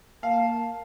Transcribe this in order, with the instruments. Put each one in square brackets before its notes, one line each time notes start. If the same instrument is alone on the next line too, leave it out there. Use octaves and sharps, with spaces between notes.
[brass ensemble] A#3 [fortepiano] F5 [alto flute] A5